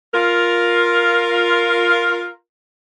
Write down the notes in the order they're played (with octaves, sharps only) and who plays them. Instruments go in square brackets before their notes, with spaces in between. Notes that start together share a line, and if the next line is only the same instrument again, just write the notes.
[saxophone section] F4 A#4